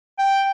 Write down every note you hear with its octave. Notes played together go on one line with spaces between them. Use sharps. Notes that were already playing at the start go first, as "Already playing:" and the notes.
G5